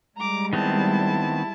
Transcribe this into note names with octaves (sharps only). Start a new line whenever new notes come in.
G3 G#3 A#5 D6
D#3 B3 C4 E4 A5